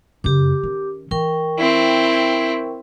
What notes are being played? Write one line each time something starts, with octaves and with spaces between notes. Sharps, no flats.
F#2 C#3 G4 D6
D#3 C#4
E3 A#4 G5 C#6
C4 E4